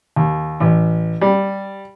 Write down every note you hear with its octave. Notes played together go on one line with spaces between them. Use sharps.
D#2
A1
G3